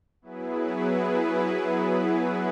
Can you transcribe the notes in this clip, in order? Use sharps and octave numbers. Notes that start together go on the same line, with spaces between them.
F#3 B3 E4 G#4 B4